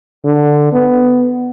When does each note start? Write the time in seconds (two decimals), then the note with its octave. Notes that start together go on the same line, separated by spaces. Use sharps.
0.24 D3
0.73 B3